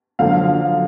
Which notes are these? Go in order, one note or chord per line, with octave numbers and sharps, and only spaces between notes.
F#2 D3 F3 F5